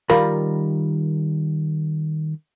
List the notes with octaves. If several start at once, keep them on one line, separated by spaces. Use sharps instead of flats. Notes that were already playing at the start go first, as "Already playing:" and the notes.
D#3 G3 F4 A#4 B5